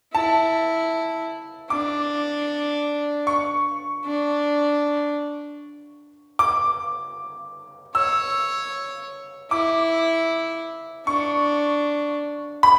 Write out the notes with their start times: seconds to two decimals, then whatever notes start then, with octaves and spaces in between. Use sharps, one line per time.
0.14 E4 A5
1.70 D4 D6
3.27 C#6
4.05 D4
6.39 D6
7.95 C#5 E6
9.51 E4 D6
11.07 D4 C#6
12.63 B5